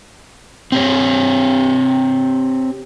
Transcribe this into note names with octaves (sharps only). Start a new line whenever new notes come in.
C4 G4 C#5